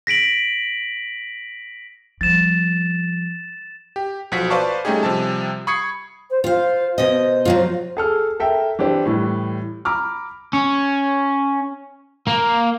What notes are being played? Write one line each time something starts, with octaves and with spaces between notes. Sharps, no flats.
A#6 B6 D7 F#7
F3 G3 A6 E7
G4
B1 F3 F#4 B6
B4 C5 D5 F5 A5 C#6
G3 A3 C#4 D#4 G4 G#4
C3 F3 G3 A5
B5 C#6 D#6 G#6 C7 C#7
C5
F4 C5 F5
B2 C5 D#5
F3 F#3 F4
G#4 A4 F6
A4 A#4 E5 G5
E3 D4 G4 C5
A2 E3 G3
A#5 B5 D6 F6
C#4
A#3